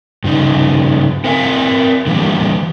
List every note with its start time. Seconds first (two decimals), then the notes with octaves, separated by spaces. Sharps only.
0.24 G2 C#3 D#4
1.24 C4 A#4 E5 F5 G#5
2.07 D3 E3 G3 A#3